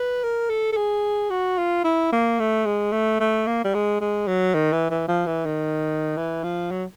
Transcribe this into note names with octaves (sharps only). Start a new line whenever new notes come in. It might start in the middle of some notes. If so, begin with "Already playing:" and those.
Already playing: B4
A#4
A4
A4
G#4
F#4
F4
E4
A#3
A3
G#3
A3
A3
A#3
G3
G#3
G#3
F#3
D#3
E3
E3
F3
E3
D#3
E3
F3
F#3